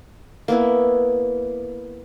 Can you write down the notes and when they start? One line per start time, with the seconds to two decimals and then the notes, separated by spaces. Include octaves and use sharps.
0.48 A#3 B3 E4